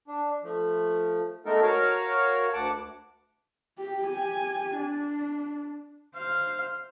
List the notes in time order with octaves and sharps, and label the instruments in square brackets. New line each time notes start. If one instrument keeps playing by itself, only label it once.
[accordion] D4
F3 A3
G#3 A3 B3 D#4 A4 A#4
F#4 A#4 C#5 F5
D2 F#5 A5 D6
[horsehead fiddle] G4
G4 G#5
D4
C5 F5